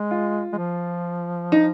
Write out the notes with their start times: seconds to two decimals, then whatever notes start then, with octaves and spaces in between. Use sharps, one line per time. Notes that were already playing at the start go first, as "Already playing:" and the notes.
Already playing: G#3
0.11 F4
0.53 G#3
0.58 F3
1.52 D#4